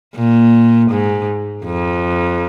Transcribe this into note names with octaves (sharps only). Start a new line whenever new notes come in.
A#2
G#2
F2